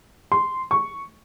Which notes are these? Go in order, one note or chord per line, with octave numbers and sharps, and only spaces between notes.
C6
C#6